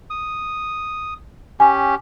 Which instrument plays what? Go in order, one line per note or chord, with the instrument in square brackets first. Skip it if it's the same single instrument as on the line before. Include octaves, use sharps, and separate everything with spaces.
[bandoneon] D#6
[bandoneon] C#4 G4 [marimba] G#5